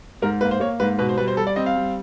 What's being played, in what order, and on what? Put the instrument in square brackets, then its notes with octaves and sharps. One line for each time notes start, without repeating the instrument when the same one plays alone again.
[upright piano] G#2 A#4
A#3 B4
C5
A#3 C#5
G#2 B4
B2 B4
C5
G3 B4
C5
G3 A4
D5
C4 D#5
F5
G3